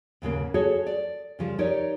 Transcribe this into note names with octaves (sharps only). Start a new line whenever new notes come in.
D#2 G#2 C#3 A#3
F#4 G#4 A4 C#5
D5
C#3 F3 G3
D#4 G4 A#4 C#5 D5